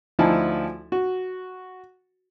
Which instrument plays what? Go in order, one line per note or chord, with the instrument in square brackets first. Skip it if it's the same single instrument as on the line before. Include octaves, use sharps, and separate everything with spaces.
[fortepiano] D2 F3 D#4 E4 G#5 A5
F#4